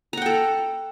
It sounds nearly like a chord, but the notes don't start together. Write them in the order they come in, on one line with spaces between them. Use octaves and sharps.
A#5 F#5 G5 A4